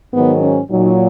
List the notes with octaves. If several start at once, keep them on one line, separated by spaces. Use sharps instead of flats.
G#2 D#3 F#3 B3
C#4
A#2 F#3 D#4